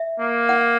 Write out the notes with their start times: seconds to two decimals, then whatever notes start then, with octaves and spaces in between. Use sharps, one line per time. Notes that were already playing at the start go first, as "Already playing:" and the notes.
Already playing: E5
0.20 A#3
0.49 F#5